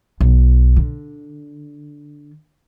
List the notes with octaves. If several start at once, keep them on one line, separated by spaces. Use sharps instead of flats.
B1
D3